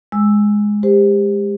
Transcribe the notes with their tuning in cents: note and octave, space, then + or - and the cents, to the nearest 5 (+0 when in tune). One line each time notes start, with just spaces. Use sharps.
G#3 +0 E6 +0
G4 +30 C5 +0